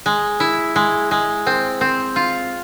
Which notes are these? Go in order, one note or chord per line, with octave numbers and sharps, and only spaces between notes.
G#3
E4
G#3
G#3
C4
C4
F4